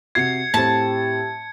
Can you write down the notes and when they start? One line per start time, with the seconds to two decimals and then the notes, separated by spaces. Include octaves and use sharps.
0.15 C3 F#4 G#6 C7 C#7
0.54 A2 C4 G4 A5